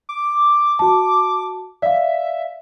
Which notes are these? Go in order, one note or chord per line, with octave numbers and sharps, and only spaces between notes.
D6
F#4 A5
D5 E5 F5